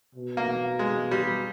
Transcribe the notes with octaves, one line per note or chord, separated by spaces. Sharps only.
B2
A#3
G#3
G3